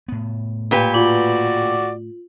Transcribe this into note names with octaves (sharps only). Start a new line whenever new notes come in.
A2 B3
A#2 G4 B4
F4 F#4 D5 F#7